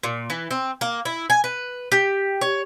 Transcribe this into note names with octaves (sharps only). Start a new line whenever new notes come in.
A#2
E3
C4
A#3
E4
G#5
B4
G4
C#5